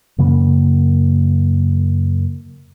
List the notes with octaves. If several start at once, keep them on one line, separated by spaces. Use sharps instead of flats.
F#2 C#3 A#3